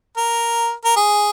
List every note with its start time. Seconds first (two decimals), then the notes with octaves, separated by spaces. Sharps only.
0.17 A#4
0.84 A#4
0.96 G#4